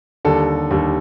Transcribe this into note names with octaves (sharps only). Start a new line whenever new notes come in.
D#2 D3 G3 A4
D#2 D3 G3